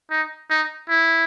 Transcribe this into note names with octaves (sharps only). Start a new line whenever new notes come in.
D#4
D#4
E4